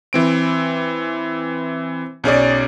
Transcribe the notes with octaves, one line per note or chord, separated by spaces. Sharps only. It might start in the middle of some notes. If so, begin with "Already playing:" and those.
E3 C4 D7
B1 C#4 G#4 D5